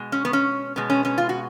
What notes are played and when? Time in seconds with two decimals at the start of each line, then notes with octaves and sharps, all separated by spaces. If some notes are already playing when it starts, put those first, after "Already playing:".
Already playing: B2 G#3
0.12 C#4
0.25 B3
0.33 C#4
0.76 B2 G#3 B3
0.90 C#4
1.05 C#4
1.18 F4
1.29 F#4